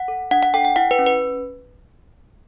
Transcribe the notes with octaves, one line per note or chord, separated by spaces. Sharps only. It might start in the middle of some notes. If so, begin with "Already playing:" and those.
Already playing: F#5
A4
D4 F#5
F#5
A4 G5
G5
E4 F#5
B4
C#4
B4